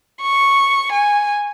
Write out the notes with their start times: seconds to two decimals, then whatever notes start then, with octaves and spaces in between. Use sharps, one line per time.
0.21 C#6
0.92 G#5